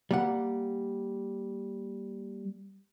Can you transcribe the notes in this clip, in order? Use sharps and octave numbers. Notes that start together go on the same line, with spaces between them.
G3 A#3 F#5